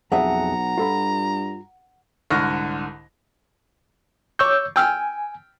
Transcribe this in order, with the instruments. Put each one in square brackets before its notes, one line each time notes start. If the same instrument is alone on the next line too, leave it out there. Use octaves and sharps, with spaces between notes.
[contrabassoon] B1 [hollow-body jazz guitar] F2 G#4 E5 [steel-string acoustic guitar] F#5 [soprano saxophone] A#5
[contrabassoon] G2 [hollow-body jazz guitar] F4 A4 B5
[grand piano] C2 G#2 D3 C#6 F6 A#6
[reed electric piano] C#5 E6 G6 [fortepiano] C#6 D6
[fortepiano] G5 E6 F6 [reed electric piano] G#5